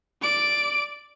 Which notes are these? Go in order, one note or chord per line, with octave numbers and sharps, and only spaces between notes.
D5 D7